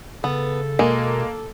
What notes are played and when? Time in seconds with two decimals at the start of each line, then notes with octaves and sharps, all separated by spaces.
0.24 C#3 B3 A4
0.79 B2 G#3 A#3